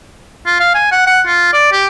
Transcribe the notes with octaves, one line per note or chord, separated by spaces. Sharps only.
F4
F5
G#5
F#5
F#5
F4
D5
G4